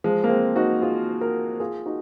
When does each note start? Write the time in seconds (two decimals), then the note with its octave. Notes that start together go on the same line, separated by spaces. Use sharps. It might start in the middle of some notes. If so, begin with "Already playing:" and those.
0.04 F3 G#3
0.24 A#3
0.29 G#3 C4
0.56 D#4 F#4
0.82 F4 G#4
1.21 F#4 A#4
1.60 F4 G#4
1.86 D#4 F#4